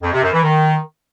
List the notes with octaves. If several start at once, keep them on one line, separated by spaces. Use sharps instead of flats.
F2
C3
F#2
E3
D#3